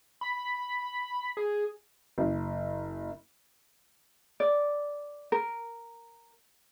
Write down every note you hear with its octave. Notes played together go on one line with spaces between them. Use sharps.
B5
G#4
F#1
D5
A#4